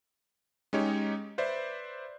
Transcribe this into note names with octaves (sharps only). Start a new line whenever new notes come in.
G#3 C#4 D#4 G4 C#5
B4 C5 D5 E5